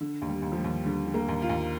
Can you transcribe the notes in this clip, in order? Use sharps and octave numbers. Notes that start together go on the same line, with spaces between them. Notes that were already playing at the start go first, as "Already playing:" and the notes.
D3
D#2
G3
D#2
F3
G3
D#2
D3 G3
D3
A#3
D#2
F4
D#2